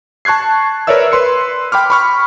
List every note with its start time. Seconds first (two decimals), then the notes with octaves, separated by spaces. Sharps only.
0.25 A5 C#6 F#6 G#6 C7
0.87 A#4 B4 C#5 D5 E5 E6
1.12 B4 C6 C#7
1.72 G5 B5 D6 F6
1.90 B5 C#6 F6